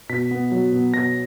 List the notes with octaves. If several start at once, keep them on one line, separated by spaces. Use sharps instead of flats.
B2 B6
B3
F#3
B2
B2 A#6